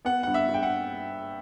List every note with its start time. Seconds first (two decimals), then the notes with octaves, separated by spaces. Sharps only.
0.05 B3 F#5
0.23 G2 F#5
0.34 E5
0.49 G2
0.54 G5
0.63 F#5